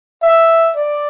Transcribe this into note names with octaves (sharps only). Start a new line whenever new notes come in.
E5
D5